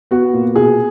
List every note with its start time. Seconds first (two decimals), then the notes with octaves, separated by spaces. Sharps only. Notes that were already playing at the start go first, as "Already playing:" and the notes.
0.11 B3 F#4
0.33 A#2
0.55 B2 G#4